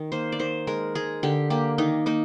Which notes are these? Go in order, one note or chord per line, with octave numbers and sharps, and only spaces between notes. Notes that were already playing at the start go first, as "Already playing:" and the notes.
Already playing: D#3
A#3 C5
D5
D#3 C5
G#3 A#4
G#3 G#4
D3 G4
A#3 G4
D#3 D#4
A#3 D#4